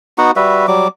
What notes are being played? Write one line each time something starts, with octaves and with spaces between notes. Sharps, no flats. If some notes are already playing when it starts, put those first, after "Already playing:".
B3 D#4 F#4 F#5
G3 F#4 B4 E5
F#3 G3 D6